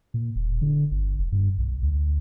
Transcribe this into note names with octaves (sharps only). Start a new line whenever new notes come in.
A#2
E1
D3
G1
F1
G2
B1
D2